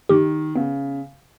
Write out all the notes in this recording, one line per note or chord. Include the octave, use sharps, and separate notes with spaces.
D#3 G4
C#3 B3